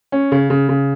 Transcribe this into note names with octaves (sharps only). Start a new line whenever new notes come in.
C#4
C#3
C#3
C#3